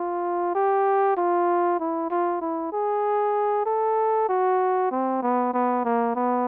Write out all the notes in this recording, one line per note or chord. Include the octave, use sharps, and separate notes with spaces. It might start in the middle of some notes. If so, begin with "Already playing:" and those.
Already playing: F4
G4
F4
E4
F4
E4
G#4
A4
F#4
C4
B3
B3
A#3
B3